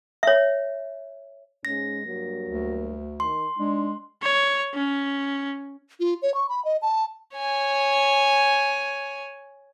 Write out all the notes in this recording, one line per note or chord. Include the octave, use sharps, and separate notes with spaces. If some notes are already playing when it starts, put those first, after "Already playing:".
C#5 E5
G#2 G#3 C#4 A#6
G2 F#3 A#3
D2
D#3 C6
G#3 D4 D#4
C#5
C#4
F4
C#5
C#6
B5
D#5
A5
C#5 G#5